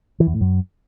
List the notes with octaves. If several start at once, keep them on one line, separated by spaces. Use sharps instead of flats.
E3
E2
A2
F#2